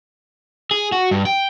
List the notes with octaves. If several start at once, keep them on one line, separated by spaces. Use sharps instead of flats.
G#4
F#4
G2
G5